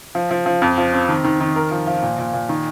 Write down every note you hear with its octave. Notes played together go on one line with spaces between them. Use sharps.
F3
F3
F3
F2
F3
C4
D#3
D#3
D#3
A#4
F3
F3
A#2
A#2
A#2
D#3